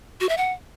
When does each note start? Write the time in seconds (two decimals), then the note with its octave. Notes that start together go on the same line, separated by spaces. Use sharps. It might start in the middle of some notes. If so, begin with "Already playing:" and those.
0.20 F#4
0.29 E5
0.37 F#5